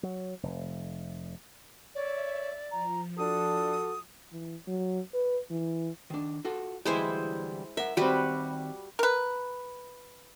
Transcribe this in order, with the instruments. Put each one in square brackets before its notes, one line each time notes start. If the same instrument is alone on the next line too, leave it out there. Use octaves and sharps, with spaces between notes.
[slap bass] F#3
F1
[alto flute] C#5 [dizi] D5 [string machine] E5
[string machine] F3 [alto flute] A#5
[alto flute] D4 [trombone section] F#4 A4 [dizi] D#6
[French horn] E3
F#3
B4
E3
[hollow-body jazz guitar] D#3 D4
F4 F#4 A4
[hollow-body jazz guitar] D2 E3 G3 [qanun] G#3 E4 C5
[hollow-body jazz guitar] A#4 F#5 [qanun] E5
[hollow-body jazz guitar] D#3 C4 [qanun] G3 F#4 B4
[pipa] A#4 B4